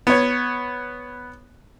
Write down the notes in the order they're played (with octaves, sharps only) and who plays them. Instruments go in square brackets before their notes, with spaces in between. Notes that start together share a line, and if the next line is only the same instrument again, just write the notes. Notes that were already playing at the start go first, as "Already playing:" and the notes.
[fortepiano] B3 C#5